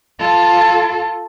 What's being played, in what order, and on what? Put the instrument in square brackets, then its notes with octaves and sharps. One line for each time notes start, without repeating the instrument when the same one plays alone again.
[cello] F4 A4